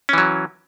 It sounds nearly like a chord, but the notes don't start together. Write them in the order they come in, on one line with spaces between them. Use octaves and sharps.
C#4 E3 F#3